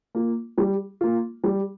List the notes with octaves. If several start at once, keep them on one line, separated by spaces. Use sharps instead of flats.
A#3 F4
G3
A#3 F4
G3